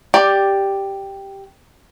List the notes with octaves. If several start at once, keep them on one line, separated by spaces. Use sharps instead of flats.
G4 D5